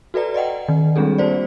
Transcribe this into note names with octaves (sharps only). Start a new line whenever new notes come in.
F#4 A4 B4 D5 A#5
D5 D#5 F#5 G5
D#3
G3 G#3 C4 D4 G#4 A4
A#3 C4 F#4 C5 D5